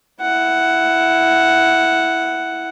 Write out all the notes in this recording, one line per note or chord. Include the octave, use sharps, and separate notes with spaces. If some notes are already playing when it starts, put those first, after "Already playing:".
E4 F#5